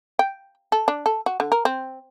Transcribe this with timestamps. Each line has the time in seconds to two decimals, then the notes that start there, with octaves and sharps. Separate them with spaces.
0.19 G5
0.72 A4
0.88 D4
1.06 A4
1.26 F#4
1.40 D3
1.52 A#4
1.65 C4